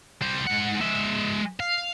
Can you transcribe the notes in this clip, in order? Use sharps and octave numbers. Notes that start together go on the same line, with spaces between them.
G3 C5
G#2 F#5
G#3 E5
F5